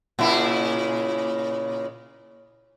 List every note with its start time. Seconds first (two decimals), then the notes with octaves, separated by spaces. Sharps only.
0.19 A#2 C#3 E4